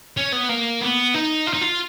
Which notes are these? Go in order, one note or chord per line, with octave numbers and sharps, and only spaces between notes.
C#4
B3
A#3
B3
D#4
F4
D#4
F4